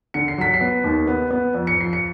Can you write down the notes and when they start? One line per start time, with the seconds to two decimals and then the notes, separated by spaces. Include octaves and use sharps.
0.14 D3 C#7
0.28 C7
0.38 F#3 B6
0.54 C7
0.61 B3
0.84 D#2
1.07 B3
1.31 B3
1.54 F2
1.67 C#7
1.78 F3 C7
1.93 C#7